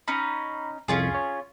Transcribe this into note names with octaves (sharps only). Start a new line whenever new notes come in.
C#4 D#4 A#5 B5
C2 F2 C#4 F4 G#4
C#5